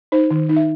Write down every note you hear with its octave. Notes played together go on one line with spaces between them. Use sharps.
D#4 C5
D#3
D#4
E5